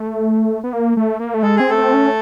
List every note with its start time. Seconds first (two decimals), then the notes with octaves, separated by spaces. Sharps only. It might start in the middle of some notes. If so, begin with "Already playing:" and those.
Already playing: A3
0.64 B3
0.73 A#3
0.97 A3
1.20 A#3
1.34 A3
1.42 G#3 A4
1.56 C4 G#4
1.69 A3 A4
1.78 C4
1.94 C#4